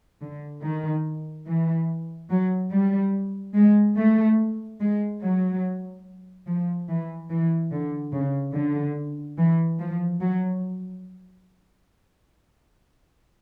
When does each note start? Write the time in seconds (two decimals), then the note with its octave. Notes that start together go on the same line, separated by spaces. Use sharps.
0.21 D3
0.62 D#3
1.46 E3
2.29 F#3
2.72 G3
3.54 G#3
3.96 A3
4.80 G#3
5.21 F#3
6.47 F3
6.88 E3
7.30 E3
7.72 D3
8.12 C#3
8.54 D3
9.37 E3
9.79 F3
10.20 F#3